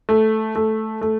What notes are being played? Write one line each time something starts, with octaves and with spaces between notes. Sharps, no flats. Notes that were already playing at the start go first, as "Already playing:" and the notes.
A3
A3
A3